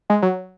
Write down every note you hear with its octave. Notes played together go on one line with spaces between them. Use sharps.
G#3
F#3